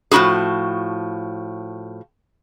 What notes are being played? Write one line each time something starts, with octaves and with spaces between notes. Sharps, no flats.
A2 F3 E4 F#4 G#4